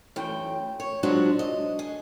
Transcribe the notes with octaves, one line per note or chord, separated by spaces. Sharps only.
F#2 E3 A3 G5
C#5
F3 F#3 G#3 D4 F#4
D#5
G#4